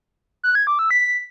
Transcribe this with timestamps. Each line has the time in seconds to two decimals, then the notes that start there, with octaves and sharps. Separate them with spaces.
0.44 F#6
0.55 G#6
0.67 D6
0.79 E6
0.91 B6